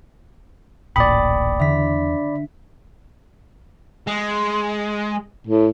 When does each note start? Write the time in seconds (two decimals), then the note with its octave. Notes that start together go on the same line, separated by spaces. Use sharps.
0.96 D1 A1 A#2 D5 G5 B5 D#6
1.60 E2 D3 E5 B6
4.07 G#3
5.47 A2